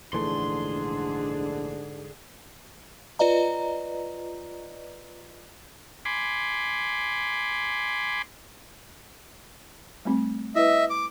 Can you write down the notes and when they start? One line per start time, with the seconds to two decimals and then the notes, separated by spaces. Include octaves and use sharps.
0.13 A#1 G#2 D3 E3 A3 D4 G#4 C6
3.19 F4 B4 D5 D#5 A#5
6.05 G#5 B5 C6 D6
10.05 G3 A3 C4
10.55 E4 B4 D#5 E5
10.90 D6